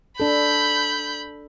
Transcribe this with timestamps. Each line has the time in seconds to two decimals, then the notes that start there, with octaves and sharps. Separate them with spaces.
0.20 D4 A4 B5 G6